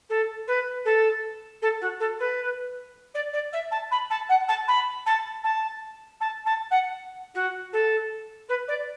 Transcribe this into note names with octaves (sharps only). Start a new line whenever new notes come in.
A4
B4
A4
A4
F#4
A4
B4
D5
D5
E5
A5
B5
A5
F#5
A5
B5
A5
A5
A5
A5
F#5
F#4
A4
B4
D5